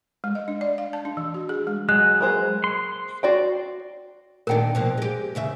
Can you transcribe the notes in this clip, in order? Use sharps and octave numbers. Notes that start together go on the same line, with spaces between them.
G#3
D#5
D4
D5
F5
A5
D4
E3
F#4
G#4
G#3
F#3 G#3 F#6
A#3 G#4 C5
C6
F#4 D5 G5
A#2 D#3 D4 A#4 G5
B2 F3 A#3
G#3 G4
E2 C#3 E5